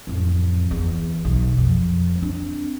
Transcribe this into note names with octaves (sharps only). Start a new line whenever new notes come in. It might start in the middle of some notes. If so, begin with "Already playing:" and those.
A1 F2
E2
B1
F2
C4 D4